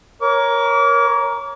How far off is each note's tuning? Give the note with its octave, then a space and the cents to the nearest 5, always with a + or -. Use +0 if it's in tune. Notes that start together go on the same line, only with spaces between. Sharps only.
A#4 +15 C#5 +0 D6 -35